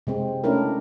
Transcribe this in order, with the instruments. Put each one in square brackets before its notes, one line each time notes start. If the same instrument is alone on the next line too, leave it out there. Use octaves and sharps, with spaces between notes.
[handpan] C3 G#3 C4
A3 C#4 D4 E4 A#4